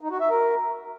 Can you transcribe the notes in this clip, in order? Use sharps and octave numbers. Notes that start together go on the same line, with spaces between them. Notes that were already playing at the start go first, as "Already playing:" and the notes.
D#4
F#4
E5
A#4